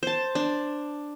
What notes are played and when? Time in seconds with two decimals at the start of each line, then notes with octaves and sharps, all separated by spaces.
0.03 C5 A5
0.35 D4